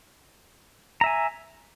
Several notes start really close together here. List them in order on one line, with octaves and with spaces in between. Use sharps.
A#5 E5 G#5